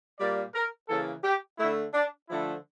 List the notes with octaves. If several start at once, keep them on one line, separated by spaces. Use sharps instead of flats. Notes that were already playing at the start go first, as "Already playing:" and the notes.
A#2 G3 A#3 D5
A#4
C#3 E3 A#3 A4
G4
D3 A3 E4
D4
D3 F3 A3 E4